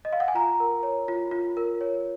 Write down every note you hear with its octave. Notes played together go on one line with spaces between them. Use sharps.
D#5
F5
F#5
G#5
F4 A#5
A#4
C#5
F4
F4
A#4
C#5